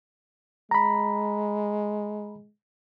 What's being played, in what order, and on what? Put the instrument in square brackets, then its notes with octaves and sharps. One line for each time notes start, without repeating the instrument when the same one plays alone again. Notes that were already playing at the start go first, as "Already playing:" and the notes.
[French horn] G#3 [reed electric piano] A#5 B5